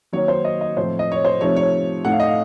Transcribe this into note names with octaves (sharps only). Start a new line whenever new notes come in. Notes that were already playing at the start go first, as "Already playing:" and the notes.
D#3 F#3 A#3 D#4 C#5
C5
D#5
D#5
A2 F3 C4 C5
D#5
C#5
C5
C3 F3 A3 D#4 C#5
C#5
A2 A3 D#4 F#5
F5
D#5
F5